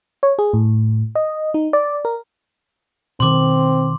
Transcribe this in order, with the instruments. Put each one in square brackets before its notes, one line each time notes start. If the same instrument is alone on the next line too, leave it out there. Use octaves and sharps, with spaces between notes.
[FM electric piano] C#5
G#4
A2
D#5
D#4
D5
A#4
[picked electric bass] B2 D#3 [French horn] C4 [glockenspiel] C6 D6